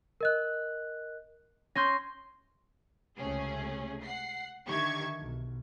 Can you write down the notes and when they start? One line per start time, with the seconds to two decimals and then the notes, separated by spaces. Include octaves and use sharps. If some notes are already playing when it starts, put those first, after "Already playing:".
0.21 A#4 D#5 F#6
1.76 C#4 C6 G6 A#6
3.18 C#2 C3 A3 C#4 G#4
4.03 F#5 C7
4.66 D3 D#3 G4 E5 C#6 G#6
5.17 B1